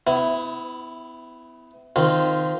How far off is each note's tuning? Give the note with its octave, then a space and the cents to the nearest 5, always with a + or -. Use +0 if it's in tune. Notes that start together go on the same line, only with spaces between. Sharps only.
B3 +40 E4 +0
D#3 +0 C4 -20 F4 +0